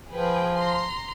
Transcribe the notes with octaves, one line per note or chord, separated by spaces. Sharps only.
F3 G#4 B4 G5
A#5 C6